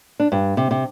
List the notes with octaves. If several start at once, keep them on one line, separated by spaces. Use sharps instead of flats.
D4
G2
C3
C3